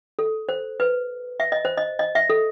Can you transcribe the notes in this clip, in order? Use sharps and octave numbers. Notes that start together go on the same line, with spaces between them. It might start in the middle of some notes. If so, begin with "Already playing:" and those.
A4
C5
B4
E5
D#5
C5
D#5
D#5
E5
A4